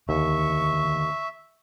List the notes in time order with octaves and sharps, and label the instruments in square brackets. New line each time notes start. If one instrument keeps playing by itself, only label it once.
[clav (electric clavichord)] D#2 [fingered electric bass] D3 D#3 A#3 [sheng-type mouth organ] E5 [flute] C#6